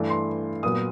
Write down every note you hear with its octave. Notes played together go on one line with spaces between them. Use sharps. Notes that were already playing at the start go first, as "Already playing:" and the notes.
Already playing: G2 E3 A3
C6
A#2 F#3 B3 D#6